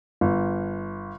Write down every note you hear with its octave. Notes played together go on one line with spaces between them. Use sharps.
G1